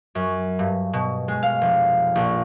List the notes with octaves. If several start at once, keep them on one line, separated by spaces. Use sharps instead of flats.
F#2
G2
B2
G#3
F5
F1
A#1